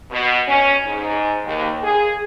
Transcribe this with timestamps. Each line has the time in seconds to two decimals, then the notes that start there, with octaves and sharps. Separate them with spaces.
0.11 B2
0.48 C#4
0.85 G#2
1.45 D#2
1.82 G#4